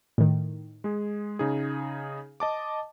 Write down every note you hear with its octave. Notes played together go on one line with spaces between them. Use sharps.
A2 D#3
G#3 G#4
C#3 D#4 G#4
D#5 A5 D6